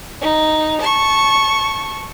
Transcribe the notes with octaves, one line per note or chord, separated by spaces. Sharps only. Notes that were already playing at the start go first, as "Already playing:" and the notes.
D#4
A5 C#6